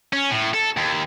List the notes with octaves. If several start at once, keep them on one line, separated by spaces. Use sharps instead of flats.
C#4
A2
A4
D#2